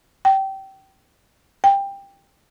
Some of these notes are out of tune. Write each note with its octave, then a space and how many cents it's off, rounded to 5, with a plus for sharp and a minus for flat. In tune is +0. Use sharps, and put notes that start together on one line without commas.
G5 -20
G5 +15